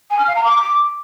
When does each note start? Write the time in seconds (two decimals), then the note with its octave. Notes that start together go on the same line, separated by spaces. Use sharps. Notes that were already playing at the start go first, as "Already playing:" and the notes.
0.10 G#5
0.19 F6
0.27 F5
0.36 A#5
0.44 D6